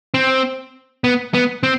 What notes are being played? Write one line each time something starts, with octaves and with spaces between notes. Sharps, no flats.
C4
B3
B3
C4